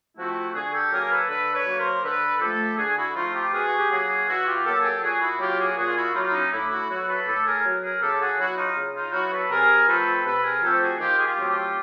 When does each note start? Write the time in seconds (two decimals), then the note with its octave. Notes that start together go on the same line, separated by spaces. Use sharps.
0.16 F3 A3 C4 E4 F#4
0.53 D3 F#4 G#4
0.72 G4 A4
0.90 F#3 A#3 G#4 A#4
1.10 A4 B4
1.28 D3 A4 B4
1.53 B4 C#5
1.66 F#3 A#3
1.79 A#4 C5
2.02 D3 A4 B4
2.40 F3 A3 G4 A4
2.77 D3 F#4 G#4
2.97 E4 F#4
3.14 F3 A3 D#4 F4
3.33 F4 G4
3.52 B2 F#4 G#4
3.67 F#4
3.78 G4
3.89 F#3 A#3 F#4 G#4
4.27 B2 E4 F#4
4.45 F4 G4
4.65 F#3 A#3 G4 A4
4.79 G#4
4.83 G4 A4
5.01 A#2 F#4 G#4
5.20 E4 F#4
5.39 F#3 A#3 F4 G4
5.58 F#4 G#4
5.76 A#2 F#4 G#4
5.86 F4
5.95 E4 F#4
6.14 F#3 A#3 D#4 F4
6.27 E4
6.32 C#4 D#4
6.51 A2 D4 E4
6.70 E4 F#4
6.89 F#3 B3 E4 F#4
7.07 A4 B4
7.25 A2 G4 A4
7.44 G#4 A#4
7.64 F#3 B3
7.82 G#4 A#4
8.00 C#3 G4 A4
8.19 F#4 G#4
8.38 F#3 B3 E4 F#4
8.57 D#4 F4
8.75 C#3
8.94 D#4 F4
9.12 F#3 B3 E4 F#4
9.31 A4 B4
9.50 C3 G#4 A#4
9.87 F3 A3 C4 A4 B4
10.25 C3 A4 B4
10.43 G#4 A#4
10.62 F3 A3 C4 G4 A4
10.81 F#4 G#4
10.99 D#3 F4 G4
11.17 G#4
11.24 F4 G4
11.37 F#3 A3 C4
11.49 F4 G4